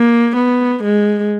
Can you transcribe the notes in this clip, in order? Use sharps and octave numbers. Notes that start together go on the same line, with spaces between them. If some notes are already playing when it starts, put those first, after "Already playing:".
Already playing: A#3
B3
G#3